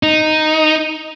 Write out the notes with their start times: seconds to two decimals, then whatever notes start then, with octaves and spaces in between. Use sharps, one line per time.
0.03 D#4